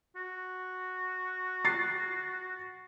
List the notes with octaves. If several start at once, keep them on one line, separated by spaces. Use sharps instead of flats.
F#4
A6 C7